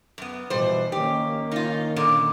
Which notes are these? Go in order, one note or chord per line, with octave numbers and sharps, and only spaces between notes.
F#2 B3
B2 E3 G3 C5
D#3 A#3 C#4 G4
D#4 F4
A#2 D3 A#4